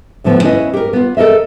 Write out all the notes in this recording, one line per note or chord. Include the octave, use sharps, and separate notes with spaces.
D2 A2 D3 F3 B3
C#4 E4 B4 D#5
G4 A#4
B3 F4
A4 A#4 D#5 E5